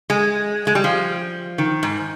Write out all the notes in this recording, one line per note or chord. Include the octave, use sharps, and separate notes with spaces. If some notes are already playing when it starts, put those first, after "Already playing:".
G#3
G#3
G3
F3
D#3
G#2